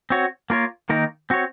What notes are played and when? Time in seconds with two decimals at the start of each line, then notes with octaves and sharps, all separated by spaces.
0.10 C4 F#4 C#5
0.50 A#3 F4 A#4 C#5
0.89 D#3 A#3 D#4 A#4
1.30 C4 F#4 C#5